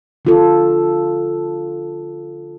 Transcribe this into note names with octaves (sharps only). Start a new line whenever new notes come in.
D3 F4 A4